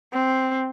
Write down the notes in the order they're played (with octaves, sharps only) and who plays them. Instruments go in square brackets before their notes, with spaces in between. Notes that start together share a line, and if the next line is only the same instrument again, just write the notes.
[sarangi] C4